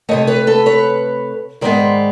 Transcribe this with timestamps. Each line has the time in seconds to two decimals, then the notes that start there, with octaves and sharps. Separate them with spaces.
0.09 C3 E3 A3 C#5 D#5
0.27 B4 C#5
0.47 A4 B4
0.66 B4 C#5
1.61 G#2 D#3 G#3 B3 C5 D5